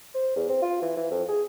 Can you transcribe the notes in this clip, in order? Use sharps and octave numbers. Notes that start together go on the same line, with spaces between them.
C5
E2
C4
F4
E3
E3
F2
G#4